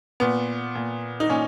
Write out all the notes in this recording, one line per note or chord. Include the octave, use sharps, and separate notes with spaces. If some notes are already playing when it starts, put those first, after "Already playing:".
A#2 B3
A#2
D#4
A#2 C#4